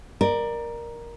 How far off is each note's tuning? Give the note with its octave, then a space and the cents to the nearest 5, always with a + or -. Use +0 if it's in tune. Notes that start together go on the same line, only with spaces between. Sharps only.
A#4 +10 D5 +25